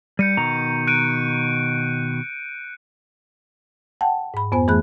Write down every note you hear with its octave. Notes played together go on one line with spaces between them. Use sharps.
G3 G6 C#7 D#7
B2 D#3 A#5
F#6 D7 D#7
F#5 G5 A5
G#2 B5
F2 B3 C5 G#5
F2 E3 A3 G#4 B5 F#6